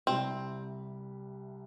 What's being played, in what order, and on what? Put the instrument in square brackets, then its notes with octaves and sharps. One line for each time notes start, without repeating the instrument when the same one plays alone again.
[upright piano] C2 C3 G3 [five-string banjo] C4